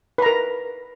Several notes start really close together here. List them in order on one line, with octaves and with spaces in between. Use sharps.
B4 A#5 A#4